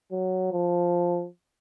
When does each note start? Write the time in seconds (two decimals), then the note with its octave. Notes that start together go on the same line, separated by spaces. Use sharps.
0.12 F#3
0.52 F3